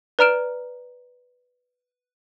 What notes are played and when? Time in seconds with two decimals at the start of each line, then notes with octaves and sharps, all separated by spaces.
0.19 B4 D5 A#5 F6 D7 E7